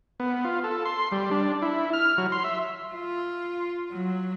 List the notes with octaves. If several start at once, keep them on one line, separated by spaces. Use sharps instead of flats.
B3
F4
A4
C6
G3
D4
E4
F6
F#3
C6
E5
F4
F#3